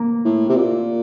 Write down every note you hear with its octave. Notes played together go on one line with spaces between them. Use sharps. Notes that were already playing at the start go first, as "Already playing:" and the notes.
Already playing: A#3
A2
C3
A#2